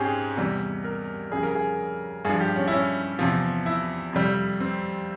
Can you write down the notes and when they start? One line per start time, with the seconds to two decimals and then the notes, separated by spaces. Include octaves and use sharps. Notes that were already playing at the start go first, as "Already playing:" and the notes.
Already playing: G#2 C4 C#4 G4 G#4
0.37 E2 C3 G3
0.84 A#4
1.31 F2 C#3 G3 G#4
1.43 A#4
1.55 G#4
2.25 G2 G#4
2.29 F3
2.41 G4
2.56 C#4
2.68 E4
2.72 C#4
3.19 E2 C3 F3
3.66 E4
4.13 F2 C3 G3
4.60 C4